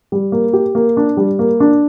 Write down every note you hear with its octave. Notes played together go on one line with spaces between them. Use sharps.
G3
A#3
G4
A#3
D4
G3
A#3
D4